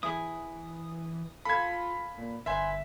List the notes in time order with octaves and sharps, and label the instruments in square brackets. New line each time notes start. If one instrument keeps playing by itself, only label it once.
[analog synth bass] E3 [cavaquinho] E4 G#4 [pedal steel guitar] D#6
[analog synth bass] F4 [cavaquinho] A4 F5 [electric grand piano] B5 G#6
[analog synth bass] A#2
[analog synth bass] G1 [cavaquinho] B4 C5 G#5 [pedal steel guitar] E5